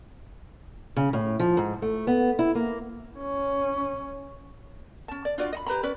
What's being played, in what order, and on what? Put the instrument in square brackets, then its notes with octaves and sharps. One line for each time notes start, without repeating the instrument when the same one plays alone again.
[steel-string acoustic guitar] C#3
A2
F3
G#2
A3
B3
E4
A#3
[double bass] C#4
[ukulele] C#4 A5
D5
D4 F4 F#4 D5
D#5 B5
G4 B4 A#5 B5
C#4 B4 D5